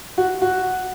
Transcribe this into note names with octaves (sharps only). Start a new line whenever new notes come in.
F#4
F#4